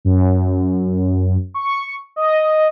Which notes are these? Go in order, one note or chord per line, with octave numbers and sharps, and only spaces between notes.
F#2
C#6
D#5